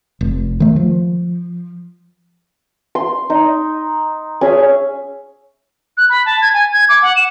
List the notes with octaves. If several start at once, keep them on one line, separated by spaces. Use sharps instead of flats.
F1
D#3 A3
F3
C6
D#4
C#4 G#4 E5
F#6
B5
A5
G#6
G#5
G#6
D6
F#5
E7